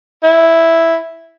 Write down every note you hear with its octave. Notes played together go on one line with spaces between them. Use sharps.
E4